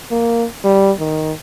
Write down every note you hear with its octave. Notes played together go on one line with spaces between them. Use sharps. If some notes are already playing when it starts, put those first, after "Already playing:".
A#3
G3
D#3